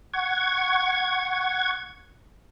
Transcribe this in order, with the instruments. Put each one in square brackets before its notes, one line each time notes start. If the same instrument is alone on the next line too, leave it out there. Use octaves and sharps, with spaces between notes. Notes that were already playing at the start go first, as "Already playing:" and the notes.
[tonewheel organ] F#5 C#6 G#6